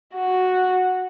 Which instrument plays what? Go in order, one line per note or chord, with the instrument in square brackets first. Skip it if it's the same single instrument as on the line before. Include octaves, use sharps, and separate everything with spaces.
[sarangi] F#4